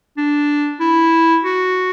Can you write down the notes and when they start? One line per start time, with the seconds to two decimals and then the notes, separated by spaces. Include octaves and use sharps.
0.17 D4
0.80 E4
1.43 F#4